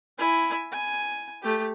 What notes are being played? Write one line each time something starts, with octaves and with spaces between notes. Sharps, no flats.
E4 G#5
G#5
A3 G4